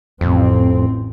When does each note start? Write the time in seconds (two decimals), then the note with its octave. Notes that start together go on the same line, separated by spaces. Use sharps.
0.21 A1 F2 C4